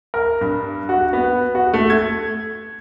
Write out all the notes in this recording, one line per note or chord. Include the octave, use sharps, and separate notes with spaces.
A#4
G2
F#4
B3
F#4
A3
G#6